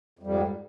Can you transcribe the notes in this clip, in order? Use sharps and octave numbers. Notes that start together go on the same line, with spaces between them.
F2 G#2 G3